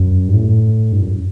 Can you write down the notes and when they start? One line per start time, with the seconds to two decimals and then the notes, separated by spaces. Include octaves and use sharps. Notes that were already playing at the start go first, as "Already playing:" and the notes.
Already playing: F#2
0.28 G2
0.33 A2
0.92 G2
1.00 F#2